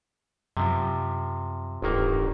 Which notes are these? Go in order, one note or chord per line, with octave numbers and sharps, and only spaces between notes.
F#2 C3 F3
D1 G1 D#3 A#3